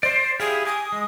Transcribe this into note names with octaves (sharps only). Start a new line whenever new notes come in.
C5 D5
E4 G4 G#4 F5
G#5 D6 D#6
G#3